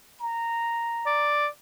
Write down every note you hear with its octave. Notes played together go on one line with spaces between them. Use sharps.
A#5
D5